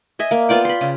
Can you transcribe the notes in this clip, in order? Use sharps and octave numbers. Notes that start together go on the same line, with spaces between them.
D#5 E5 G#5
A#3
B3 F4 D5 G5
B5 C6
C#3